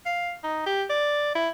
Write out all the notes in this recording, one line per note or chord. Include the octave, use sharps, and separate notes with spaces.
F5
D#4
G4
D5
E4